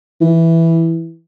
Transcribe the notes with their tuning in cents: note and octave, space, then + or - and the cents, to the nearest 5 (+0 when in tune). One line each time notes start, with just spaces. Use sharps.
E3 +0